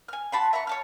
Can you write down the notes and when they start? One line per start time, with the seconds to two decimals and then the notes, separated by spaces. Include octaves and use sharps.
0.08 G#5 F6
0.32 F#4 A5 B5 C6
0.53 E5 A#5 B5 C#6
0.67 C#5 A5 F6